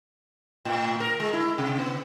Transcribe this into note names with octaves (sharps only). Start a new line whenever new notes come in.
A2
A#4
G#3
E4
C3
B3